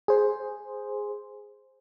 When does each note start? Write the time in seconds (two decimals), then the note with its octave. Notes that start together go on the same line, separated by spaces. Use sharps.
0.08 G#4 C5